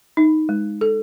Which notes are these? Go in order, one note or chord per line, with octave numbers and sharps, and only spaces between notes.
D#4
G#3
A4